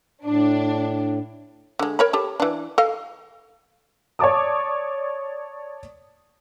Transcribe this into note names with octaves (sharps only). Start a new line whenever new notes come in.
A2 D4
D3 G#3
A#4 C#5 B5
G4 A4
E3 D4
A4 D#5 F5
C#5 D5 A5 D6 D#6